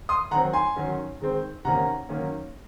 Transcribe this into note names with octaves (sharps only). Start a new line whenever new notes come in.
C6 D#6
D#3 F#3 C4 F#5 A#5
G#5 C6
D#3 F#3 C#4
D#3 G#3 C4
C3 D#3 A#3 C#4 F#5 A#5
D#3 F#3 A#3 C#4